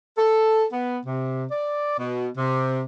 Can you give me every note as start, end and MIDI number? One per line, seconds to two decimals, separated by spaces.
0.18 0.65 69
0.72 0.99 59
1.06 1.45 48
1.51 1.96 74
1.99 2.28 47
2.37 2.82 48